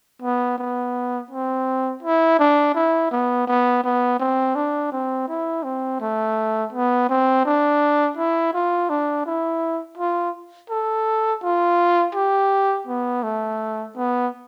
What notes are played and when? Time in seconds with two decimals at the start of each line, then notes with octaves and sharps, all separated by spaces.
0.22 B3
0.58 B3
1.31 C4
2.03 E4
2.39 D4
2.75 E4
3.11 B3
3.47 B3
3.83 B3
4.20 C4
4.55 D4
4.92 C4
5.28 E4
5.64 C4
6.01 A3
6.72 B3
7.09 C4
7.45 D4
8.17 E4
8.53 F4
8.89 D4
9.26 E4
9.97 F4
10.70 A4
11.43 F4
12.15 G4
12.87 B3
13.23 A3
13.96 B3